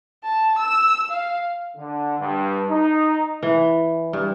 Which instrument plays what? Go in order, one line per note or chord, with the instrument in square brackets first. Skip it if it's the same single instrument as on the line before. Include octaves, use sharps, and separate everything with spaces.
[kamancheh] A5
E6
F5
[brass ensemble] D3
G2
D#4
[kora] E3
G2